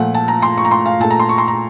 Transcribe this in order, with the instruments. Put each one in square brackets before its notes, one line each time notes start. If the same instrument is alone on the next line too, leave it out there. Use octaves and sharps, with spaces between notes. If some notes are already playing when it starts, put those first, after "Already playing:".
Already playing: [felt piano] A#2 F3 A3 F#5
A5
A#5
C6
C#6
A#5
C6
F5
A#2 A3 A5
A#5
C6
C#6
C6
A#5